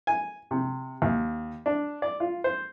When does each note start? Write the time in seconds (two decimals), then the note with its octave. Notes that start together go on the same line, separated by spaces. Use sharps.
0.07 G#5
0.51 C3
1.02 D#2
1.66 D4
2.02 D5
2.20 F4
2.44 C5